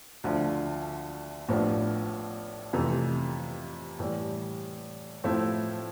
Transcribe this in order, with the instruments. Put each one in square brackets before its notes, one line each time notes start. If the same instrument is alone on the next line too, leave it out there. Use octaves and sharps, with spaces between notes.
[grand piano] D2 D3 F3
A1 A2 F3 B3 D4
F2 C3 E3 A3
A2 E3 G3
A2 F3 A3 C4 E4